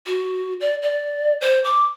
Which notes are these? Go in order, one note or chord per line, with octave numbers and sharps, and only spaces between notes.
F#4
D5
D5
C5
D6